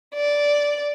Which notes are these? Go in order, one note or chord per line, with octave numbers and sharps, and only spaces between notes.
D5